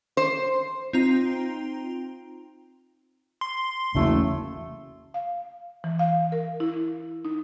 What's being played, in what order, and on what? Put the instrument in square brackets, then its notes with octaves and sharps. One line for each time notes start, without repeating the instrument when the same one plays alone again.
[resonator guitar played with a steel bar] C5
[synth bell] C4 D#4 F4 A#5
[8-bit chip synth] C6
[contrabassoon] F#1 [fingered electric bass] E2 C#3 [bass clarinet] A3
[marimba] F5
E3
F5
A#4
E4
D#4